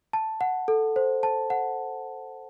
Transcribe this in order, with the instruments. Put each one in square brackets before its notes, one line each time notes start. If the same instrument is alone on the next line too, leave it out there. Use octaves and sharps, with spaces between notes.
[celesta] A5
F#5
A4
C5
A5
F#5